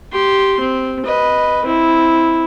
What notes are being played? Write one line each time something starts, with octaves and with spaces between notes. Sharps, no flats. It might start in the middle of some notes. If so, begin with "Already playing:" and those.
G4 C6
C4
B4 D#5
C4 E4